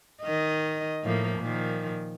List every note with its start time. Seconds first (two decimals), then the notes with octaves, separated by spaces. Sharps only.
0.23 D#3 D#5
1.03 A2 F3 A#3
1.39 A#2 D#3 F3